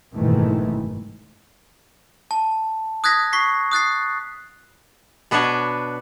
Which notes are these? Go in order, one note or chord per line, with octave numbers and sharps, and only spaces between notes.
F#1 G#2 B2 D#3 E3 A3
A5
D#6 F#6 G#6 A#6 B6
C#6 B6 C7
D#6 F#6 A6 C7
B2 B3 D4 B4 C#5